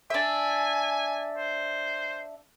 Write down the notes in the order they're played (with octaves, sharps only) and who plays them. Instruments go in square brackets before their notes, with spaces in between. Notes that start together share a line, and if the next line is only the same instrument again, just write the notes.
[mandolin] D4 E5 [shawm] G#5
[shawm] C5